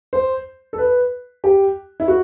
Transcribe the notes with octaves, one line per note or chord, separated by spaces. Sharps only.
C5
A4
B4
G4
E4
F#4